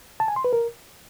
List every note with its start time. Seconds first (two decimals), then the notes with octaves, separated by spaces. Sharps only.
0.20 A5
0.28 G#5
0.36 C6
0.44 B4
0.53 A#4